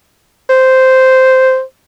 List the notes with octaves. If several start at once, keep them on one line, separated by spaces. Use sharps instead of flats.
C5